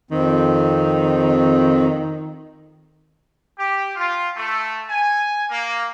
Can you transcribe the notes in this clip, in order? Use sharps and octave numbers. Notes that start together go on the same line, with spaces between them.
F2 D#3 C4
G4
F4
A3
G#5
A#3